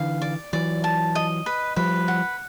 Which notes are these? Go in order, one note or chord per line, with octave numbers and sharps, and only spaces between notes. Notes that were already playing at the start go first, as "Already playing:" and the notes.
Already playing: D3 E3 F5
D5
E3 F#3 D5
A5
D#5
B4
F3 G3 B4
F#5